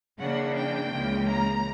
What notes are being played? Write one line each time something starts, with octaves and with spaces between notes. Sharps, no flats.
C#3 E3 A#3 D4 F#5
G5
C#2 C#3 E3 A#3
A#5